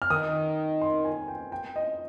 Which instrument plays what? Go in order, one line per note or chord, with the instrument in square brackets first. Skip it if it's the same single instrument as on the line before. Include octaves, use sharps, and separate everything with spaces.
[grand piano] F6
[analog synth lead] D#3 [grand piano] D#6
[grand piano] C6
G#5
G5
G5
D#5